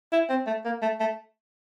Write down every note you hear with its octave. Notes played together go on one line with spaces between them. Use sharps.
E4
C4
A3
A#3
A3
A3